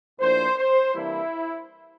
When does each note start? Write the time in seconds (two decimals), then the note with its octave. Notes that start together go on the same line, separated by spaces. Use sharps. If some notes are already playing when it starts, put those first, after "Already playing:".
0.20 A2 F3 A#3 D4 C5
0.57 C5
0.95 C3 E3 G3 A#3 D4 E4